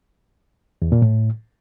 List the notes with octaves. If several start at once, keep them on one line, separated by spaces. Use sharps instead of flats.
E2
A#2
A2